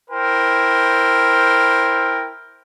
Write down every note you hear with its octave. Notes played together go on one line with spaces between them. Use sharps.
E4 A#4 C5 G5